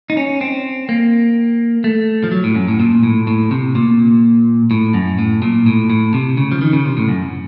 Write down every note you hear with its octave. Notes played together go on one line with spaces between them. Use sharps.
D#4
C#4
C4
A#3
A3
F3
F#3
A2
F#2
A2
A#2
A2
A2
C3
A#2
A2
F#2
A2
A#2
A2
A2
C3
C#3
F3
D#3
C#3
C3
A2
F#2